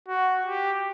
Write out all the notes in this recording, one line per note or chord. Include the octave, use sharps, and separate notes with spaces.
F#4
G4